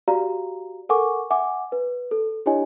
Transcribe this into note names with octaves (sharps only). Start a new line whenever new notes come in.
F#4 G4 D5 F5 A#5
A4 A#4 F#5 G#5 C#6 D6
E5 F#5 G#5 D6
B4
A4
D4 E4 G4 C#5 D#5 G#5